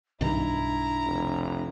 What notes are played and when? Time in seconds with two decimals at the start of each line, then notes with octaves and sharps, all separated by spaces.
0.21 B1 G2 D#3 D4 E4 A#5
1.06 F1